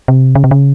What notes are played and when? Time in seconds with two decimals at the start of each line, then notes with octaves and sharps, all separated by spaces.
0.08 C3
0.35 C#3
0.44 C3
0.51 C#3